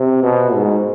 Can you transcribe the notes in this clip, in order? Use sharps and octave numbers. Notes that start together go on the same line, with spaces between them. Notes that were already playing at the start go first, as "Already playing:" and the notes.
Already playing: C3
B2
G#2